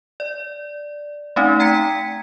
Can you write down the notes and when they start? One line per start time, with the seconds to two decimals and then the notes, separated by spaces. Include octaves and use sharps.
0.20 D5
1.36 A3 C4 C#4 D#4
1.60 G5 A#5 G#6 B6 C#7